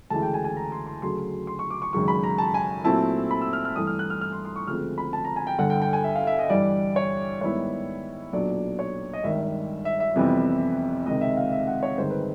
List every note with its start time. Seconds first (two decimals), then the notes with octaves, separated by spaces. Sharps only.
0.10 D2 C#3 E3 G#3 A5
0.22 G5
0.34 G#5
0.44 G#5
0.57 A#5
0.72 C6
0.87 C6
1.02 D2 C#3 F#3 C6
1.47 C6
1.59 C#6
1.70 D6
1.82 C#6
1.93 G#1 F#2 C#3 F#3 C#6
2.08 B5
2.24 A#5
2.38 A5
2.54 G#5
2.84 A#2 F#3 A3 C4 E4 A5
3.31 B5
3.42 E6
3.53 F6
3.65 F6
3.76 G2 E3 A3 D#6
3.87 F6
3.99 F#6
4.10 F6
4.21 F6
4.32 C6
4.45 C6
4.56 C#6
4.67 D2 C#3 F3 G#3 C4 F6
4.98 B5
5.13 A5
5.25 A#5
5.36 G#5
5.47 G5
5.58 G1 G2 D3 F#5
5.70 G5
5.82 G5
5.93 G#5
6.04 E5
6.16 F5
6.27 E5
6.39 D#5
6.50 G2 E3 G3 D5
6.96 C#5
7.41 G#2 D#3 G3 B3 E4 C#5
8.32 B1 A#2 F#3 B3 D4 D5
8.79 C#5
9.13 D#5
9.24 G#1 G2 D#3 G3 E5
9.85 E5
10.00 E5
10.16 F2 C3 E3 G3 B3
11.06 C#2 C3 D#3 D#5
11.21 E5
11.37 F5
11.52 E5
11.68 F#5
11.83 C#5
11.97 G1 G2 D#3 G#3 C4 C5
12.10 B4